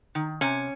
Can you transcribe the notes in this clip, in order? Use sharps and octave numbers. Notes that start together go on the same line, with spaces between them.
D#3
C3 C#4